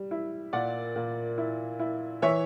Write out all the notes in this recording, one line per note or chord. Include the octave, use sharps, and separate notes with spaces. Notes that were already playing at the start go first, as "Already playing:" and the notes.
Already playing: G3
E4
A#2 D5 F#5
A#2
E4
E4
E3 C#5 E5